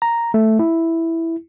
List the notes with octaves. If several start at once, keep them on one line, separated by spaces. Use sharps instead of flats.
A#5
A3
E4